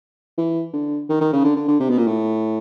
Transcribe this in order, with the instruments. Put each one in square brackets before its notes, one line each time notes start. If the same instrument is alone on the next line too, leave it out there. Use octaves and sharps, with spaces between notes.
[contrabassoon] E3
D3
D#3
D#3
C#3
D3
D3
D3
C3
B2
A#2
A2